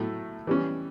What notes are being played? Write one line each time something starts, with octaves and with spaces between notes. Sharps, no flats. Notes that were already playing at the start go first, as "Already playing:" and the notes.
Already playing: A2 F#3 A3
E3 G3 C#4